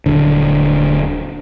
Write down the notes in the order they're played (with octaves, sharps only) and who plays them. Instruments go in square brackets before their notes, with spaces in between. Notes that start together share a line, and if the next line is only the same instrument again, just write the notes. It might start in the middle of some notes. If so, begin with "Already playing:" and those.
[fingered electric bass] D#1 D3